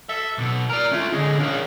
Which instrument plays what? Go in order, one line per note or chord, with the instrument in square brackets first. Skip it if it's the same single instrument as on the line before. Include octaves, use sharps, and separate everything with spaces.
[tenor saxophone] A4 [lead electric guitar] E5
[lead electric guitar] B1 B2
[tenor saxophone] A#4 [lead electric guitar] D5 A#5
[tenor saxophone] A3 [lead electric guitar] C#4 F4
[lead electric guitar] D3 C#4 [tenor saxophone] G#3
[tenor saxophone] C#3 [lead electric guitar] D4 A#4